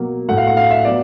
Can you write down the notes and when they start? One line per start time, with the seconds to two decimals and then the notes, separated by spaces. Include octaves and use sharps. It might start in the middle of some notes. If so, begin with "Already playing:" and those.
Already playing: B2 F#3 A#3
0.29 A2 F#3 A3 F#5
0.37 F5
0.47 F#5
0.57 F5
0.71 E5
0.85 F#3 B3 D5